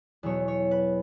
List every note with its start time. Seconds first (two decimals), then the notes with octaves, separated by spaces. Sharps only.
0.23 E2 B2 F#3 C#5
0.48 C#5
0.71 B4